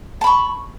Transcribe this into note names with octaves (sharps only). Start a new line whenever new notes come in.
A5 B5 C#6